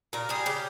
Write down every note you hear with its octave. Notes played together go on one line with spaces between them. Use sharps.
A#2 A#4
G3 G#4
C#3 G4